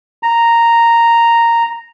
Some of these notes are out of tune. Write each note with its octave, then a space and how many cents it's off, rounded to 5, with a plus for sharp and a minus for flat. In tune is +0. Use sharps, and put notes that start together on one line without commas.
A#5 -5